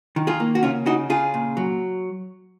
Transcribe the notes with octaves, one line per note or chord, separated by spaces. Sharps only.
D#3
F4 G#4
A#3
F#4
C#3 C#4 F4
C#3 D#4 F#4
C#3 F4 G#4
A#2
F#3